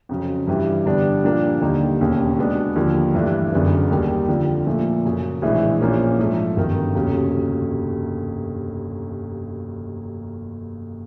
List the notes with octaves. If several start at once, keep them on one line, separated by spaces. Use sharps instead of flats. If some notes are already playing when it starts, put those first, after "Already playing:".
F2 C#3 F#3
G2 E3 G3
G2 D3 G3 B3 D4
A#2 F3 A#3 D4 G4
D#2 D3 G3 A#3 D#4
E1 D#2 C#3
B2 G#3 B3 D4
D#2 D3 F3
G2 E3 A3 D4
F#1 F#2 D3 F#3 B3
D#2 D#3 G3
F2 D3 F3
A#2 F3 A3
F#2 C#3 F#3
A#1 A2 E3 G#3
A#1 A#2 F3 A#3 C#4
G#2 F3 A3
G1 F#2 D#3
F1 D#2 C#3 F#3